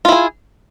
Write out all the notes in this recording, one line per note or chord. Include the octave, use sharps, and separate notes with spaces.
E4 F4 G#4